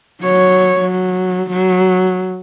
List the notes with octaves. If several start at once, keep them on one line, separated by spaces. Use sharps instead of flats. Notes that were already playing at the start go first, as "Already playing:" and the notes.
F#3 C#5
F#3
F#3